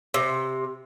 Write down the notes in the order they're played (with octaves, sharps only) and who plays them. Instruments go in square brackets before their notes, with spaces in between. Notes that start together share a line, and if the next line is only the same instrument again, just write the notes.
[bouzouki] C3